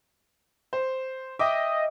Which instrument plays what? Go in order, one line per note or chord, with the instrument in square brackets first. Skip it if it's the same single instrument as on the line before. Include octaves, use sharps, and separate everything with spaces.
[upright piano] C5
[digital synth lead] D#5 [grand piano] E5 G5 [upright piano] D6